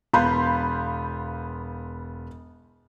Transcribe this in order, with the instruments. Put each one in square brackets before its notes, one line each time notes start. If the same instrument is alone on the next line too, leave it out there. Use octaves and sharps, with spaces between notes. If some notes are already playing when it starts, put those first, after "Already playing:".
[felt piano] E1 B3 F5 B5 C6 G6